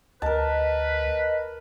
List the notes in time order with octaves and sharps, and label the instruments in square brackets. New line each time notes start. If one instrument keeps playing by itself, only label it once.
[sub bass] D2 [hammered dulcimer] A#4 A5 [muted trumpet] B4 [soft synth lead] D#5